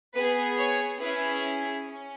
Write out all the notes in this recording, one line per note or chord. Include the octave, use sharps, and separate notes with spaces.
B3 G#4 B4
C#5
C#4 E4 G#4 B4
C#4